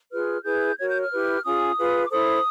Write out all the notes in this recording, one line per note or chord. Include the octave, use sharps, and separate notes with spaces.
F4 G#4 B4 F6
E4 G#4 B4 G6
F#4 A#4 C#5 G#6
G6
F6
E4 G4 B4
C#4 F4 G#4 D#6
F4 G#4 B4
D6
E4 A4 C5 D#6